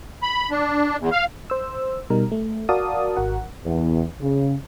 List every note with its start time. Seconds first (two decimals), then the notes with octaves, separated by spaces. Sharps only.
0.23 B5
0.51 D4
1.00 E2
1.12 F5
1.50 C5 E6
2.10 B2 G3 D#4 A#4
2.32 A3
2.69 F#4 A#4 D5 F5 A5 D#6
3.16 G#1 F#4 A#4 F#5
3.65 E2
4.21 C#3